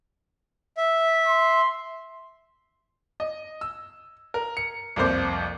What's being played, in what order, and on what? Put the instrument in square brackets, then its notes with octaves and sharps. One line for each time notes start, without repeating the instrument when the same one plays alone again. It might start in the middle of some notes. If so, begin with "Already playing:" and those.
[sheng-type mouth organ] E5
[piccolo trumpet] C6
[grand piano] D#5
E6
A#4
C#7
C2 F2 A#3 C5 D6